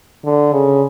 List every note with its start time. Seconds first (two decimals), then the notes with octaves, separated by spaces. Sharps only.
0.25 D3
0.53 C#3